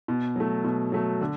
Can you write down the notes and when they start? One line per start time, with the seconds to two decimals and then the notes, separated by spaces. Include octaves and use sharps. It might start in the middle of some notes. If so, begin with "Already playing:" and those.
0.08 B2
0.36 F#3 A3
0.64 B2
0.92 F#3 A3
1.21 D3